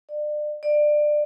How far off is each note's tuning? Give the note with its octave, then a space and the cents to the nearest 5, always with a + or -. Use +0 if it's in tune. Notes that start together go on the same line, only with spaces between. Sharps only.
D5 +30
D5 +20